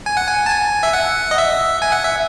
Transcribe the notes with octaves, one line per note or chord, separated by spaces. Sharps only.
G#5
F#5
G#5
A5
G#5
E5
F#5
D#5
E5
G#5
F#5
E5